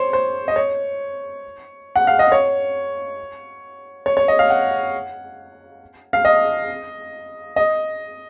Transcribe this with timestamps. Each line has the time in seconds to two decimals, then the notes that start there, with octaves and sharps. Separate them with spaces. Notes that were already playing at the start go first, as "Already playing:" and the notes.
Already playing: C5 C#5
0.13 C5
0.48 D#5
0.56 C#5
1.96 F#5
2.07 F5
2.19 D#5
2.32 C#5
4.06 C#5
4.17 C#5
4.28 D#5
4.39 F5
4.50 F#5
6.13 F5
6.25 D#5
7.56 D#5